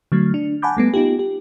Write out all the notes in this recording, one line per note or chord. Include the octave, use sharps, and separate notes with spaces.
D3 F#3 A3
D4
F#5 G#5 A5 B5 D6 G6
G3 A3 B3
B3 D#4 F4 G4
G4